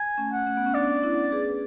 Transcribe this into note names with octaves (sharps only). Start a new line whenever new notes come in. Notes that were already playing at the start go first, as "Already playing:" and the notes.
Already playing: G#5
A3 C#4
F#5
A3 C#4
B3
C#4
B3 D4 D5
C#4 E4
G#4 B4
B4